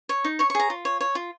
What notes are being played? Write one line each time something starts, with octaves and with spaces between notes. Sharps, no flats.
C#5
D#4
C#5 C#6
C#6
G#4 A#5
F4
C#5
C#5
F4